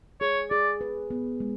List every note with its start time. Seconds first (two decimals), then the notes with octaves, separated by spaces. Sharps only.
0.21 G#4 C#5
0.50 G#4 D5
0.81 B4
1.10 B3
1.40 G#3